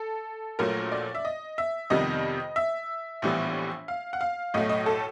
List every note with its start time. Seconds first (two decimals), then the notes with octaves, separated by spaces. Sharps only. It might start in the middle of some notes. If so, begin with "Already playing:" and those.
Already playing: A4
0.59 A#1 A#2 F#3 A3 A#4
0.92 D5
1.15 E5
1.25 D#5
1.58 E5
1.90 F2 C3 D#3 G3 B3 D#5
2.56 E5
3.22 A#1 A2 E3 G3 B3
3.88 F5
4.13 F#5
4.21 F5
4.54 B1 A2 F#3 A3 D#5
4.69 D#5
4.86 A4